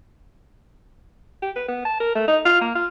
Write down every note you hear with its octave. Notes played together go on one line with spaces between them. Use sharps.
G4
B4
B3
A5
A#4
A3
D#4
F4
A#3
F4